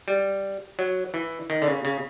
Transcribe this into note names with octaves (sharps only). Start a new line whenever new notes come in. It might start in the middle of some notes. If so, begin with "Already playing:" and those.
G3
F#3
E3
D#3
D3
C#3
C#3